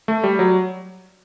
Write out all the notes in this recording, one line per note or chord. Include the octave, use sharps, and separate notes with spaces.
A3
G3
F#3